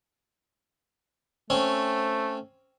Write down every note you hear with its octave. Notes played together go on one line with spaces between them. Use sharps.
A3 C4 C#4 C#5